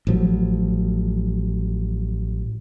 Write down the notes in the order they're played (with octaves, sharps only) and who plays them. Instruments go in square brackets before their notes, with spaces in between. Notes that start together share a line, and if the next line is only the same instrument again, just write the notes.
[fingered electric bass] A1 F3 F#3